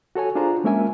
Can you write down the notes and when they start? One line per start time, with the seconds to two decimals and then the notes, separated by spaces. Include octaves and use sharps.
0.15 F#4 A4 C#5 G#5
0.35 D4 F4 G#4 C5 A#5
0.64 G#3 A#3 C#4 A#4 E5 G#5